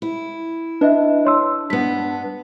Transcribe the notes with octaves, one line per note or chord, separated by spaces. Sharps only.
E4
D4 B4 D#5 E5
C#5 C6 E6
G2 B3 B6